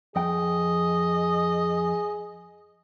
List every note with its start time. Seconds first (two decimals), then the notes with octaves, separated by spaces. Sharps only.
0.16 F2 G#4 D#5 G5